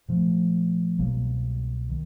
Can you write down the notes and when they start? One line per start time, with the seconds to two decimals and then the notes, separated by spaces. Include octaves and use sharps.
0.08 A#2 F3 A3
0.99 C2 B2 F#3 A#3
1.90 D#3